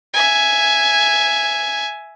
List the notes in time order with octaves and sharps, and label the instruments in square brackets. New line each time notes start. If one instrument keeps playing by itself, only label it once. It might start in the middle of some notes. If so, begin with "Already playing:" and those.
[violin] E5 G#5